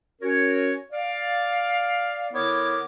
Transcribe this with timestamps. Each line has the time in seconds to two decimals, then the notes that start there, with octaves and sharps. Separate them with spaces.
0.22 C#4 F#4 A#4 C#5
0.92 D5 F5
2.33 D3 B3 E4 A#4 C#5 D6